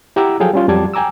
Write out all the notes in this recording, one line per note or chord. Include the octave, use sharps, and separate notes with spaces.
E4 G4 F#5 A#5 D6 E6
F3 F#3 G#4 A4 F5 G5
G3 C#4 F4
F2 F#3 G3 A5 D6 G#6
G5 G#5 A#5 D6 E6